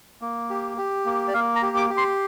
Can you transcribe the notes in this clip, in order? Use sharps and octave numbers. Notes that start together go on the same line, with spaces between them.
A#3
G4
G4
A#3
D5
A#3 F5
A#5
G4
D6
G4
C6